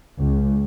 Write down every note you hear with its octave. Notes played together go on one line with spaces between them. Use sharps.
C#2